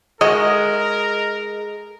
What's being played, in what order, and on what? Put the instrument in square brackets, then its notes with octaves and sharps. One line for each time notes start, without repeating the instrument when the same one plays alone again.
[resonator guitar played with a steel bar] G#3 [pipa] D#4 F#4 D#5 [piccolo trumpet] A#4